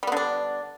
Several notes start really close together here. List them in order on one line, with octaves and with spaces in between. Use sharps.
G3 B3 D3 D4